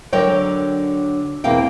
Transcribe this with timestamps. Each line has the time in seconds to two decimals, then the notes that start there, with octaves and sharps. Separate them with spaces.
0.13 D3 F#3 A#4 C#5 D5 G5
1.44 E2 B2 A#3 C4 F5 G5